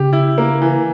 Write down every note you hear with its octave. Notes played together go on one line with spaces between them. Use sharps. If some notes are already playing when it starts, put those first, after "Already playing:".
Already playing: C#3 G4
E4
A#3
E3